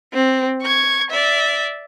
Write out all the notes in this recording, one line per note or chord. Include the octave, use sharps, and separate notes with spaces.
C4
C#6 G#6
D5 E5